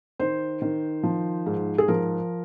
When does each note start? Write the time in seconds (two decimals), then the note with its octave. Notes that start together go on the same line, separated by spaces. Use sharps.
0.19 D#3 C5
0.62 D#3
1.03 F3
1.46 G#2
1.78 G#4
1.88 F3 A#4